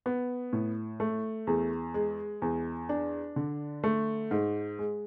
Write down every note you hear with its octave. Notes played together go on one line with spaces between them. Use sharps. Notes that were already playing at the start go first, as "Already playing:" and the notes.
B3
A2
A3
E2
G#3
E2
D4
D3
A3
G#2
G#3